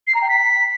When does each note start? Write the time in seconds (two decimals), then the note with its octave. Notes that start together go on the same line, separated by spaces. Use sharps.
0.07 C7
0.14 A#5
0.22 G5
0.29 B6